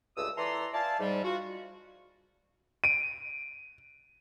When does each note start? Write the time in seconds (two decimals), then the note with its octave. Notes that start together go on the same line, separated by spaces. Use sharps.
0.17 C#2 G2 A3 D#6 E6
0.37 E3 A4 D5 A#5 C6
0.73 D5 E5 F5 G#5 A5
1.00 G#2 G3
1.24 F4 F#4
2.84 D7 D#7